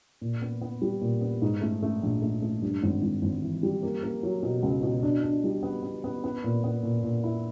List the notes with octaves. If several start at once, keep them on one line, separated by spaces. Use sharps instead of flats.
A#2
B3
B3
G3
A#2
B3
G#2
A3
A3
A#1
A3
A3
G2
G#1
G#1
G#1
E3
G3
A#3
A#3
F#3
B2
C#2
B2
D4
D4
G3
B3
B3
B3
B3
A#2
B3
A#2
A#2
E4